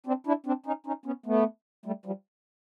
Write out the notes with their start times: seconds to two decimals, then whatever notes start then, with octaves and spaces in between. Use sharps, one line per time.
0.06 C4 D4
0.27 D4 E4
0.46 C4 D4
0.66 C#4 D#4
0.86 C#4 D#4
1.06 B3 C#4
1.26 A3 B3
1.86 G3 A3
2.05 F3 G3